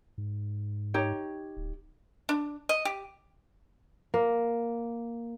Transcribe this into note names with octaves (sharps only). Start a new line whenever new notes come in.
G#2
D#4 G4 C#5
D1
D4
D#5
G4
A#3